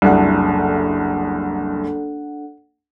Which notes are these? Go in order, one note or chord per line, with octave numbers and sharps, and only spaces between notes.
F#1 C2 D4 A4 F#5